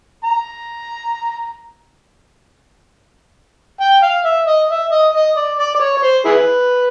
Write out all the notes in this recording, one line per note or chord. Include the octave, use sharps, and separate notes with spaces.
A#5
G5
F5
E5
D#5
E5
D#5
D#5
D5
D5
D5
C#5
C#5
C5
E4 G#4 B4